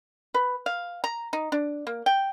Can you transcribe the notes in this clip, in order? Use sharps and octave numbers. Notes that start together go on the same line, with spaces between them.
B4
F5
A#5
D#4
D4
A#3
G5